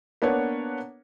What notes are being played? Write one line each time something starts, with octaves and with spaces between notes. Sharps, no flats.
A#3 B3 D4 B4 C#5 F#5